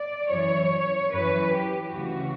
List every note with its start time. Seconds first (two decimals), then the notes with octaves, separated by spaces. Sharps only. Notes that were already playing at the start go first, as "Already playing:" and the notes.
Already playing: D5
0.30 F#2 E3 C#5
1.13 F#2 E3 B4
1.54 G4
1.96 D2 C#3 E3 F#4